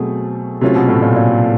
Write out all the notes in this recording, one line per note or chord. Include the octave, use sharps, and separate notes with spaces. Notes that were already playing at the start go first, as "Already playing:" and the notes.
Already playing: B2 F#3 A3 C4 G#4
C3 F#3 A3 C#4 F4 A4
B2
A2
A#2
A#2